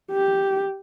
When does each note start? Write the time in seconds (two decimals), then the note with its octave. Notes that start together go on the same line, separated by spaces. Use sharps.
0.11 G4